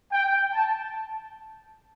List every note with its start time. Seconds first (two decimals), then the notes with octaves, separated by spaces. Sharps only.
0.12 G5
0.53 A5